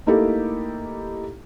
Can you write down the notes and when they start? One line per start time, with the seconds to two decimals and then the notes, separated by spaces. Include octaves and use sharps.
0.06 A3 A#3 D#4 E4 G4 A4